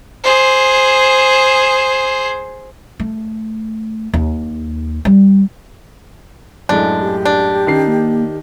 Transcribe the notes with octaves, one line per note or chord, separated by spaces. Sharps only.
G#4 C5
A3
D#2
G3
F#2 A2 G#3 D4
G4
D4
D#3 C#4 C7
A#3